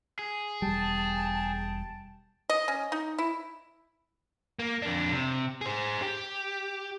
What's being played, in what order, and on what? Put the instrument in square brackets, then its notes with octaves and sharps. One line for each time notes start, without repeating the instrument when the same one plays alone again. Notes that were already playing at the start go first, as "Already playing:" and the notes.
[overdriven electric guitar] G#4
[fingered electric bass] E1 G3 [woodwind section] G5 A5
[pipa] D#5
C#4
D#4
E4
[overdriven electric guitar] A#3
F2 D4
C3
G#4 C5
G4